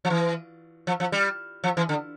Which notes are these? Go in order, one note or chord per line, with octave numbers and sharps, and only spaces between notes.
F3
E3
F3
F3
G3
F3
E3
D3